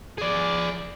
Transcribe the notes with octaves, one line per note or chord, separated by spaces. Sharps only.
G#4 D5